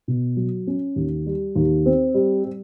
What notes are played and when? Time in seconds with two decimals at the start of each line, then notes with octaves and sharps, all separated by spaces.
0.08 B2
0.37 F#3
0.67 C#4
0.96 D#2
1.26 G3
1.56 D#2
1.86 C4
2.14 G3
2.44 G3